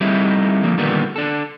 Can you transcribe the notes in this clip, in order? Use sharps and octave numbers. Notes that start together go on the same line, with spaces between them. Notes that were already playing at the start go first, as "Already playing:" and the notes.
G3 A3 C4 D#4 E4
D3 F3 A#3
A#2 D3 D#3 G3 B3
D4 A4